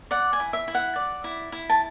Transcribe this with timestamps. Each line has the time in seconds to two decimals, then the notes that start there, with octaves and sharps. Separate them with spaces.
0.11 D5 F#5
0.33 G#5
0.40 E4
0.53 E5
0.68 E4
0.75 F#5
0.96 D5
1.24 E4
1.52 E4
1.70 A5